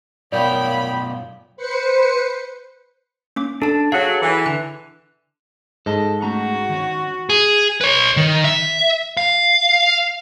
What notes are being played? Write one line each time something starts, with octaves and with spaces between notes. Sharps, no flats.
F#2 B2 A#3 F4 C#5 D5 G5 B5
B4 C5 C#7
A#3 C#4 D6
D4 A4 A5
F#3 G#4 A4 F5 F#5
E3
D3 F#6
G#2 A4 D#5 A5
A3 C#4 F#4 A#5
D#3 C#4
G#4
B4 C#5
D#3
E5
F5